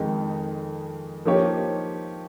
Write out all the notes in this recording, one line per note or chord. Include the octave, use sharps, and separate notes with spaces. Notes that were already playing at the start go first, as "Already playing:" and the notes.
Already playing: F2 D#3 G#3 D#4
F3 A#3 D#4 G4 C#5